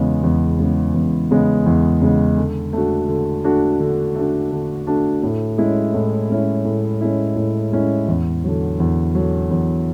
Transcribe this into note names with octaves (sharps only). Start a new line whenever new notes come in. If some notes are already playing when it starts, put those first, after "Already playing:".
Already playing: E2 C#3 G#3 B3
E2
C#3 G#3 B3
E2
C#3 G#3 B3
E2
C#3 G#3 B3
D3
A3 D4 F#4
D3
A3 D4 F#4
D3
A3 D4 F#4
D3
A3 D4 F#4
A2
G#3 C#4 E4
A2
G#3 C#4 E4
A2
G#3 C#4 E4
A2
G#3 C#4 E4
E2
D3 F#3
E2
D3 F#3
E2